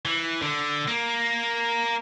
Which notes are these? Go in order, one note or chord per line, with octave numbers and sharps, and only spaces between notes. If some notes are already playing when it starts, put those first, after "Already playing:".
E3
D3
A#3